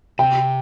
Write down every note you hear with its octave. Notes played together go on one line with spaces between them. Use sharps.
C3 G5